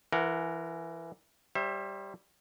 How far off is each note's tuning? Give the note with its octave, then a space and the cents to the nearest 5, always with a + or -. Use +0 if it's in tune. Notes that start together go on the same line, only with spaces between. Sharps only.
E3 +15 A#4 -5 F#5 -5
G3 +0 C5 +35 E5 +0